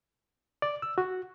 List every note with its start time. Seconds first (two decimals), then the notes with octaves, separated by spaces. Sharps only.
0.62 D5
0.82 E6
0.98 F#4